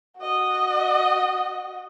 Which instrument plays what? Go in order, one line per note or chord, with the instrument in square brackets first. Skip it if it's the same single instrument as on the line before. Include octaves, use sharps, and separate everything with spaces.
[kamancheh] F#4 D#5